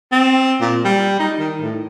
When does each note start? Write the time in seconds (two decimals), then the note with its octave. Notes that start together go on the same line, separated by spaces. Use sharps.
0.11 C4
0.61 A#2
0.84 G3
1.19 D#4
1.39 D#3
1.61 A2